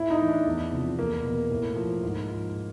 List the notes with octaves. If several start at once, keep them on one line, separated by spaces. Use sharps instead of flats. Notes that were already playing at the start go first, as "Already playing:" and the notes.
Already playing: A2 E4
D#4
E3
D4
E2
C3 F3
E2 A#3
B2
A2
F3
G#2
F3